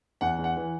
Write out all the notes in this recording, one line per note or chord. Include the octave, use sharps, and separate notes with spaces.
E2 F#5
E2
F#5
E3